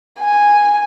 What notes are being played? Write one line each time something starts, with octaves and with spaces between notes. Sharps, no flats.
G#5